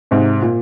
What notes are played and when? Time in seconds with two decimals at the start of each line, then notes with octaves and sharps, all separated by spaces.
0.11 G#2 C3
0.42 A#2